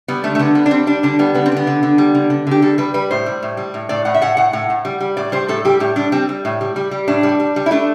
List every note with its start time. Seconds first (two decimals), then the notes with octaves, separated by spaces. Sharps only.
0.08 G3 B3
0.24 D3 A3
0.35 A3
0.39 D3 B3
0.55 G3 B3
0.66 D4
0.71 G3 C4
0.87 G3 D4
1.03 D3 D4
1.19 G3 B3
1.34 D3 B3
1.46 C4
1.52 D3 B3
1.67 D3
1.83 D3
1.98 G3
2.15 D3
2.30 D3
2.47 D3 G4
2.62 G3 A4
2.78 G3 B4
2.94 G3 B4
3.11 A2 C5
3.26 G3
3.43 A2
3.57 G3
3.74 A2
3.89 A2 D5
4.05 A2 F#5
4.14 E5
4.22 A2 F#5
4.37 A2 F#5
4.53 A2 F#5
4.70 A2
4.85 G3
5.00 G3
5.17 A2 D5
5.32 G3 C5
5.48 A2 A4
5.65 G3 G4
5.80 A2 G4
5.96 G3 D4
6.12 G3 C4
6.29 G3
6.45 A2
6.61 G3
6.76 G3
6.91 G3
7.08 A2 D4
7.23 G3
7.40 G3
7.56 G3
7.66 E4
7.71 A3 D4